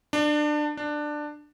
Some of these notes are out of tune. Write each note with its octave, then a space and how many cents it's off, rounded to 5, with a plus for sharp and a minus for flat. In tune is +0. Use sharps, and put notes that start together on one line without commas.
D4 +25
D4 +15